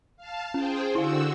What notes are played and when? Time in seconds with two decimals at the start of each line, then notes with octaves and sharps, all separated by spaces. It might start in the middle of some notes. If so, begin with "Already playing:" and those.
0.17 F5 A5
0.54 C#4 G#4 C5 G5
0.95 D3 E4 F#4 F5 E6